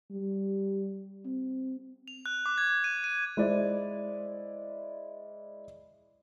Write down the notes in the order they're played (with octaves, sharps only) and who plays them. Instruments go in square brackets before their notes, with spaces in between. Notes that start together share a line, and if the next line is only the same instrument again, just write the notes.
[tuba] G3
C4
[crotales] F7
F#6
D6
G#6
D#7
D#7
[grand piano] G#3 E4 C5 D5